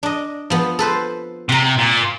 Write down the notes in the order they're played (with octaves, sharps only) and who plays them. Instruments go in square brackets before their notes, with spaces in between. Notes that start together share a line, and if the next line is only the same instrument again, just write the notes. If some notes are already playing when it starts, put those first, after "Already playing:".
[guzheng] D4 D#5
F3 B3
A4 B4 C5
[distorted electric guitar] C3 [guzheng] F#5 A#5
[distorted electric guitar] A#2